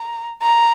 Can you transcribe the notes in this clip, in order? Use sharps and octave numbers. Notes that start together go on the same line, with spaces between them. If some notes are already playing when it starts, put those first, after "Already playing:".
Already playing: A#5
A#5